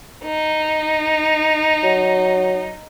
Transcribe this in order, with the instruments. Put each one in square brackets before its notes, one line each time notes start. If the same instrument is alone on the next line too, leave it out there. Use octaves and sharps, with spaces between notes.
[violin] D#4
[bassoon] F#3